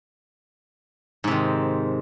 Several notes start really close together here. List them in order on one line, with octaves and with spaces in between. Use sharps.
G#2 C3 D#3